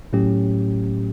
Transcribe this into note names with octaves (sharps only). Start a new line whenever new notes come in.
A2 F#3 A3 C#4 G4